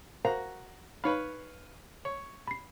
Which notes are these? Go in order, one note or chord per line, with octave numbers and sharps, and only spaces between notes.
F#4 A#4 C5 F5 A#5
D#4 B4 C#5 F5 B5
C#5
B5 C7